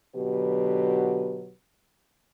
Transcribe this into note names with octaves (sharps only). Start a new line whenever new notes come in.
B2 D3 F#3 G4 B4